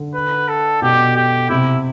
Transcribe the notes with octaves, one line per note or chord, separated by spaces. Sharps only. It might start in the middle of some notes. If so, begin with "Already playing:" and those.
Already playing: D3
B4
A4
B2 G4
G4
C3 E4